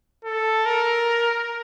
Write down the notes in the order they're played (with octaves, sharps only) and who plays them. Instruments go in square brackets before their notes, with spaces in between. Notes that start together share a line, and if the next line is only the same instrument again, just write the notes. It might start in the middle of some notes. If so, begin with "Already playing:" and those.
[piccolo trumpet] A4
A#4